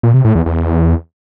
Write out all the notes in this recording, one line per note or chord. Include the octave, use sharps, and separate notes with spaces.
A#2
C3
A2
E2
E2